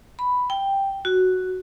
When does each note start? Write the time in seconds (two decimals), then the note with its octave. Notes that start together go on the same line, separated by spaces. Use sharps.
0.19 B5
0.50 G5
1.05 F#4